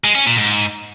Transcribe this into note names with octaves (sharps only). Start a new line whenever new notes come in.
G#3
C#4
A#2
G#2